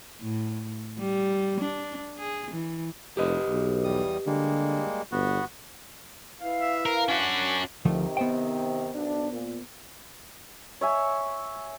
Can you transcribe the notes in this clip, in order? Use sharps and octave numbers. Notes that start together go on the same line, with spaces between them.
A2
G3
D4
G#4
E3
F1 G4 B4 D#5
B1
E2 G3 D#6
D3 G3 G#3 A#3
G1 B3 F#4
E4 B4 F5
E5
A#4
C#4 D4 F#4
D2 C3 D#3 F3 A3
B3 C5 G5
B1 D4
A#2
C#5 E5 G#5